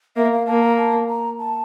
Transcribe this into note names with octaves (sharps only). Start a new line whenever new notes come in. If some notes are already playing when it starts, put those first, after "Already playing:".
A#3 E5
F5
A#3 A5
A#5
A5
A#5
A5